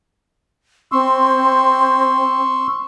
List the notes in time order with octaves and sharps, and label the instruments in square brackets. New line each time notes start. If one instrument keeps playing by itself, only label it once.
[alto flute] C4 [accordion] C6 C#6 E6